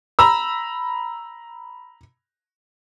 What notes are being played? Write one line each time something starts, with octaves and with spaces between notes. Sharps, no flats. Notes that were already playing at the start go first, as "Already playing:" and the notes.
A#5 B5 E6